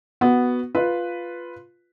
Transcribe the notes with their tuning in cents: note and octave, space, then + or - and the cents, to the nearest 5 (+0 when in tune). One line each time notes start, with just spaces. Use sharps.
B3 +0 F#4 +5
F4 +0 B4 +0